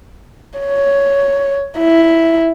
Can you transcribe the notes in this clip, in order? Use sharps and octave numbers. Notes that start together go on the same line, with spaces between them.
C#5
E4